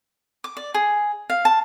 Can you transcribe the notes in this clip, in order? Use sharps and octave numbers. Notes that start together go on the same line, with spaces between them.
D6
D5
G#4
F5
A5